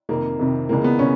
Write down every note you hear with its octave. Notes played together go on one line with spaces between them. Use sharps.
F2 C3 D#3 A#3
F2 C3 D#3
C#2 C#3 E3 A#3
B3
C#3 C#4